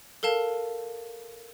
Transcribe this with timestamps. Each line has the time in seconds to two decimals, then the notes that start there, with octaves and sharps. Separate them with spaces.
0.23 A4 A#4 F5 A5